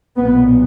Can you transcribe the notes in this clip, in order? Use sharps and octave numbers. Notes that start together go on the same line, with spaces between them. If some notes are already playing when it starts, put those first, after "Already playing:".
B1 A#2 B3